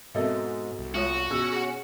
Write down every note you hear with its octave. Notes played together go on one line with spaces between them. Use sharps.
G#2 B2 C4 A4 A#4 D#5 E5
C2
G#3 F4 F#4 C#5
B2 C#4 G#4 E6
G#4 F#5